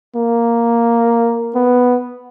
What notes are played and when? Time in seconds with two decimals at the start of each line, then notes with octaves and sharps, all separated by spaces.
0.16 A#3
1.55 B3